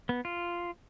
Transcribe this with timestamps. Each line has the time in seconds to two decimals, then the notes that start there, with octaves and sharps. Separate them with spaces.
0.09 B3
0.25 F4